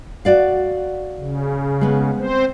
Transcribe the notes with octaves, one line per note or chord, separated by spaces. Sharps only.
F#4 D5 F5
C#3
G#3 B3
C4 C5